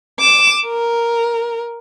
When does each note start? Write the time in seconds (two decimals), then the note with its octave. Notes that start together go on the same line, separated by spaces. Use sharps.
0.20 D6 E7
0.66 A#4